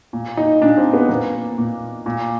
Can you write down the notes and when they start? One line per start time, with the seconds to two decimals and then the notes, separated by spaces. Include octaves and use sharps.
0.13 A#2
0.37 D#4
0.61 A#2 D4
0.78 C4
0.93 B3
1.09 A#2 A#3
1.58 A#2
2.06 A#2